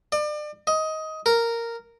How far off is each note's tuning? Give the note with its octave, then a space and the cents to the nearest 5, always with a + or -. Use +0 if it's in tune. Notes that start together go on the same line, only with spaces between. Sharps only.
D5 +35
D#5 +15
A#4 -10